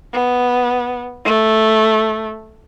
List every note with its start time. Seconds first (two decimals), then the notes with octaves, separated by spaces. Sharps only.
0.13 B3
1.25 A3